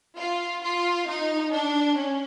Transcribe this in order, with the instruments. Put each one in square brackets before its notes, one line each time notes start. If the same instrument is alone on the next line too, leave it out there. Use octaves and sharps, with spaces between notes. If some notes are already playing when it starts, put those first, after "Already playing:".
[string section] F4
F4
D#4
D4
C#4